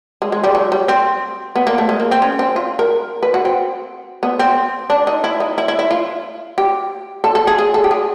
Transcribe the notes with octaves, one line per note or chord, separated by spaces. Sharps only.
G#3
G#3
G3
F#3
G3
C4
B3
A#3
A3
G#3
A#3
C4
C#4
C4
F4
A#4
B4
F#4
C4
B3
C4
D4
D#4
E4
D#4
E4
E4
E4
F4
G4
A4
A4
G#4
G#4
A4
G4
G#4